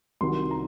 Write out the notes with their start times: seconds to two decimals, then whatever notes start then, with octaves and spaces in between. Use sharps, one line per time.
0.21 C2 C3 D#3 F#3 C6
0.51 A#5